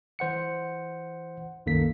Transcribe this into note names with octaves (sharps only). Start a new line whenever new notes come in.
E3 C5 F#5 C#7
C2 F#2 D#3 A#3 A4 B6